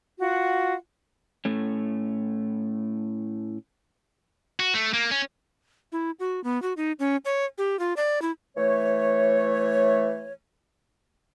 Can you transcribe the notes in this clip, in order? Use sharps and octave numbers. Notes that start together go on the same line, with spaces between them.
F4 F#4 F#5
A2 A3 C#4
F#4
A3
A#3
C#4
E4
F#4
B3
F#4
D#4
C#4
C#5
G4
F4
D5
E4
E3 A3 C#5